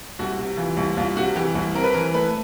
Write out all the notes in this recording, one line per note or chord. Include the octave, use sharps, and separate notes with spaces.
C2 F#4
C3
E3 F4
C2
C2 F4
C3 F#4
E3 G4
C2
C4 A#4
B4
E3 A#4
A3 B4